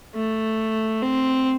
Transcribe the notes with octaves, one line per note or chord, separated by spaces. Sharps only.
A3
C4